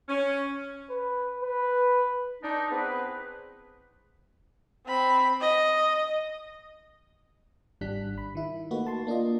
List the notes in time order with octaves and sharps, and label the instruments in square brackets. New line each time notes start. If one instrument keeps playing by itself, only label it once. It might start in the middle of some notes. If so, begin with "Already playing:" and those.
[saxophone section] C#4
[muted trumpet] B4
B4
[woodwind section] D4 D#4
B3 C4 E4 G#4 B4
[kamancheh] C4 B5
D#5
[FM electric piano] G#1 G3 D4 F#6 B6
B5
D#3 E4
A3 A#3 D#4 F#4 B4
A5 C6
A#3 D4 F4 D#5